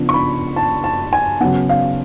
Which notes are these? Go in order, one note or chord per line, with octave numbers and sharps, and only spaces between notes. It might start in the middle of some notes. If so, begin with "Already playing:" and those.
Already playing: C#3 F3 B3 D4
C#6
B5
A5
A5
G#5
C#3 F#3 B3 F#5
F5